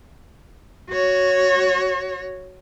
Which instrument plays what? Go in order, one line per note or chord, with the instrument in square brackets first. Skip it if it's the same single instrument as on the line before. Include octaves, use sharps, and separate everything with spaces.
[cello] F#4 C#5